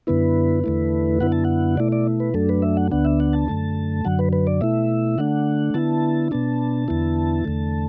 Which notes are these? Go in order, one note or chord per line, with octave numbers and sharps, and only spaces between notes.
F#2 D3 B3 E4 B4
E2 D3 A3 E4
F#2 D3 B3 E4 F#5
A5
F#5
B2 A3 E4 D5
D5
B4
F#2 F#3 A3 D4 A4
B4
E5
F#5
D2 D3 B3 D4 F#5
E5
F#5
A5
F#2 D3 A3
F#2 D3 F#3 F#5
B4
B4
D5
B2 A3 E4 E5
D3 A3 D4 F#5
D3 B3 E4 A5
B2 B3 D4 A5
E2 D3 B3 E4
E2 D3 A3